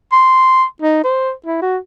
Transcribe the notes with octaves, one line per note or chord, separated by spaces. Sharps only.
C6
D#4
C5
E4
F#4